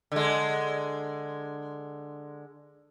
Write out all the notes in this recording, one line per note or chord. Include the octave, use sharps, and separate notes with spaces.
D3 G#3